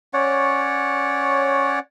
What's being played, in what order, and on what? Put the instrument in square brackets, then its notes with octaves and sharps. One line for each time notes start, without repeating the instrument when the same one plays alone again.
[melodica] C#4 C#5 D5 F#5